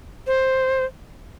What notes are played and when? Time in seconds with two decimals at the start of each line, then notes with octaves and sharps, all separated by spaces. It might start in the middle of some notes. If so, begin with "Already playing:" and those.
0.27 C5